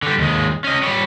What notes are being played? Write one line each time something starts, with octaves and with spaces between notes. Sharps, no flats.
D3 G3
D#2 G#3
C#4 D#5
G3 C#5